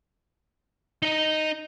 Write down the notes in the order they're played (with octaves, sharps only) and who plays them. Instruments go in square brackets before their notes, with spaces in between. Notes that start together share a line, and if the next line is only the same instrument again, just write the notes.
[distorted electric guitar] D#4 D#5